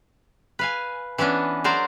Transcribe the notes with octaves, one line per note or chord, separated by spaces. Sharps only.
B4 F5 G#5
E3 B3 C#4 D4
F#3 A#4 C5 D5